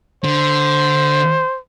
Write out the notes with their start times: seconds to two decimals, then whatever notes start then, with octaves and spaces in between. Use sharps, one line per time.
0.24 D3 C5